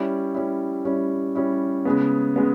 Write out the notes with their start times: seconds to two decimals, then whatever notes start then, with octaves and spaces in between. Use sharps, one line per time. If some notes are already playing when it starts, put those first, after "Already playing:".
Already playing: G3 C#4 E4
0.34 G3 C#4 E4
0.85 G3 C#4 E4
1.35 G3 C#4 E4
1.85 C#3 G#3 B3
2.36 C#3 G#3 B3